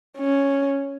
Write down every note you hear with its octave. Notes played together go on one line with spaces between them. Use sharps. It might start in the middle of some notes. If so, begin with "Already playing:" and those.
C#4